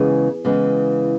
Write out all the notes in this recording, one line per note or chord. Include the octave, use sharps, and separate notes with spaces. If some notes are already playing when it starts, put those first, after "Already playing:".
Already playing: C#3 E3 G#3 B3 G#4
C#3 E3 G#3 B3